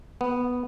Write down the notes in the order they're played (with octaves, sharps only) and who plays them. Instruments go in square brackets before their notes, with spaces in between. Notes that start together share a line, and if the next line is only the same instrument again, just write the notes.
[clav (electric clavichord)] B3